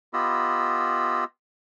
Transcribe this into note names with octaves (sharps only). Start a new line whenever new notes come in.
B3 F4 G4 D#5 B5 E6